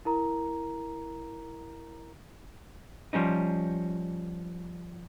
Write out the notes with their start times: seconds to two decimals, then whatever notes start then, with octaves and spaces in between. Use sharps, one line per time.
0.05 E4 A#4 A#5
3.13 F3 G3 C#4 D#4